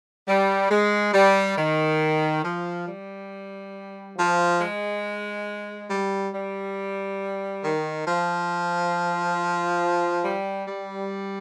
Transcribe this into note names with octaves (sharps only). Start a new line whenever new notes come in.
G3
G#3
G3
D#3
F3
G3
F3
G#3
G3
G3
D#3
F3
G3
G3